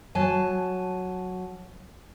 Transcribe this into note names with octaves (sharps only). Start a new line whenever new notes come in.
F#3 G#5 A5